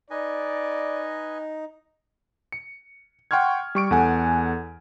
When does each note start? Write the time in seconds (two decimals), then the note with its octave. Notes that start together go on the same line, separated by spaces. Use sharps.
0.10 D#4 B4 D5 D#5 G#5
2.52 C#7
3.31 F#5 G5 C6 C#6 F6 G#6
3.75 G3 C#6 D7
3.91 E2 A4 F#5 G#5